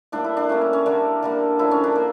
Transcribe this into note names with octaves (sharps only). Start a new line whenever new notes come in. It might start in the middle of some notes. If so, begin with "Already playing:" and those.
A2 G3 A#3 D4
E4
D4
A2 G3 A#3 C#4
A#3
C#4
D3 G3 A#3 D4
D3 G3 A#3
A2 F3 A#3 E4
C#4
D4
A#3